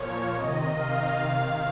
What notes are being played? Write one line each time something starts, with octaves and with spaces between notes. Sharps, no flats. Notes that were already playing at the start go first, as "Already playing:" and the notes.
Already playing: A#2 F3 C#5
C3 D#3 D#5
F5
C3 D#3 F5